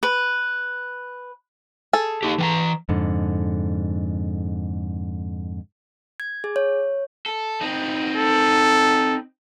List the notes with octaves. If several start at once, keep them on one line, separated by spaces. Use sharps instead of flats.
B4
G#4 A4
D#4 G4
E3 G5 A#5
F2 G#2 D3
G#6
G#4
C#5
A4
C4 D#4
A4